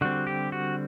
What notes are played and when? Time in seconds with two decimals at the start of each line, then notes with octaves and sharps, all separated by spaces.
0.01 D3 G3 C4 F#4
0.27 G4
0.52 F#4